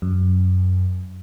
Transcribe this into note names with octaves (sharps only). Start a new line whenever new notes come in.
F#2